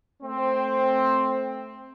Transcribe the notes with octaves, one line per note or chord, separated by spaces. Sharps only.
A3 C4